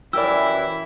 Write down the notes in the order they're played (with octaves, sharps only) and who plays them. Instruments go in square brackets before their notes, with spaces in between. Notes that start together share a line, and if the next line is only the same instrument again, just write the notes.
[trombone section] F#2 E3 [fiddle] E4 [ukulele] G4 A#4 D5 [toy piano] E6